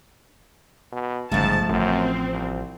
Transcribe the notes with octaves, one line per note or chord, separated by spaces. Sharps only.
B2
G1 C#2 G#2 F3 A3 A5
A1 F#2 C4
C2